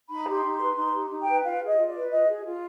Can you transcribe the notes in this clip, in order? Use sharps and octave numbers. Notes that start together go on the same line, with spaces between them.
D#4 B5
G4 C6
D#4
C6
B4
D#4 C6
G4
D#4
G5
B4
F4 F5
G#4
D#5
F4
D5
B4
F4 D#5
G#4
F4